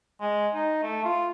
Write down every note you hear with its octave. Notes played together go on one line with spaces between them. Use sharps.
G#3
D#4
A3
F4